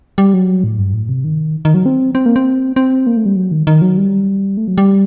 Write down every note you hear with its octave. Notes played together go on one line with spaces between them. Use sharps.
G3
F#3
A2
G2
A2
C3
D#3
D#3
F#3
C4
C4
A#3
C4
C4
A#3
A3
G3
F#3
D#3
D#3
F#3
G3
A3
F#3
G3